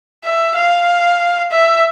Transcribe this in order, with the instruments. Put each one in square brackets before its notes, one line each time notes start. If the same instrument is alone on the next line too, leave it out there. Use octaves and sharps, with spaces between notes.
[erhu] E5
F5
E5